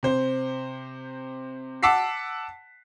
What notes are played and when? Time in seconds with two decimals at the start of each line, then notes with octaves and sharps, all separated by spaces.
0.03 C3 C5
1.83 F#5 A5 D6 E6 B6 C7